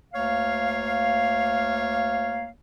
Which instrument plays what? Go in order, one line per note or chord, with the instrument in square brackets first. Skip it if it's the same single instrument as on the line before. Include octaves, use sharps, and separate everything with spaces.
[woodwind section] D2 A#3 C#5 F5